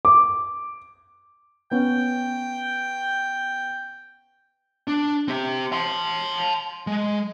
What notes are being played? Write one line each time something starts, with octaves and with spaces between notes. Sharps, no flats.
D6
B3 C#4 G5
D4
C4 G4
A5 C6
G#3